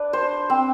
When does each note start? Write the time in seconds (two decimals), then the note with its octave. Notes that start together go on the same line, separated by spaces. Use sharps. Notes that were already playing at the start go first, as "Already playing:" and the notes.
Already playing: D4 B4
0.13 C5
0.50 C4